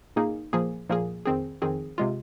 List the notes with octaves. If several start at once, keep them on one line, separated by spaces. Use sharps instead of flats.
A#2 A#3 D#4 G#4
A#2 F3 A#3 G#4
A#2 F3 A#3 G#4
F2 D#3 C4 G#4
F2 D#3 C4 G#4
C3 G#3 F4